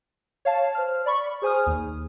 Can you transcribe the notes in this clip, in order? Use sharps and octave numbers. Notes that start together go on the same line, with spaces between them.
C#5 F5 A5
C5 F6
D5 B5 C#6
G#4 C5 G#5 D#6 F6
D#2